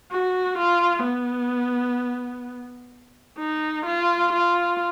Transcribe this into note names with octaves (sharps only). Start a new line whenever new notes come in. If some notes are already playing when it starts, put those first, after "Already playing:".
F#4
F4
B3
D#4
F4
F4